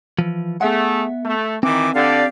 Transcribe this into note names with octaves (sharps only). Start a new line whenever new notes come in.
E3 F3
A3 B3 G#4 E5 F#5
A3
D#3 E3 C4 D6
D3 G4 D5 F5